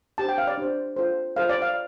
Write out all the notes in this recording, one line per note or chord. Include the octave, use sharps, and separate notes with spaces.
D4 G4 C5 A5
G5
F5
D5
D4 G4 C5
F4 A4 C5
F4 A4 C5 F5
D5
F5